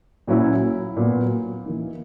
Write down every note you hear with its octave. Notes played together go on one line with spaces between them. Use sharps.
A#2 F#3 C#4 E4
A#2 F#3 B3
E3 A#3 D#4